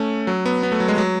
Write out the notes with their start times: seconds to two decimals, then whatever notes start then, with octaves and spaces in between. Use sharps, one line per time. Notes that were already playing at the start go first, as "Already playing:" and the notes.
Already playing: A3 C#4
0.27 F#3
0.46 B3
0.63 B3
0.72 A3
0.80 F#3
0.88 G#3
0.98 F#3